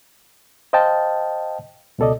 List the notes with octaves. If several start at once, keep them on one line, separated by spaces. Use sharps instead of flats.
C5 D#5 F5 G5 A5
C#2 B2 A4 D5 D#5